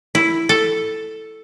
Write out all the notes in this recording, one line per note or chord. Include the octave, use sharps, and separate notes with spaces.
E4
A4